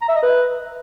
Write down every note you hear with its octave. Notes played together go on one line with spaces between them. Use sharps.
A#5
E5
D#5
B4